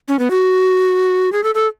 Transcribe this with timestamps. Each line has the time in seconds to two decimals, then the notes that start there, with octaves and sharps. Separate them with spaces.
0.08 C#4
0.19 B3
0.31 F#4
1.32 G#4
1.44 A4
1.55 A4